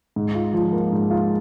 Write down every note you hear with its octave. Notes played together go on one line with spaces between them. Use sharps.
G#2
F4
F3
A#3
G#2
F4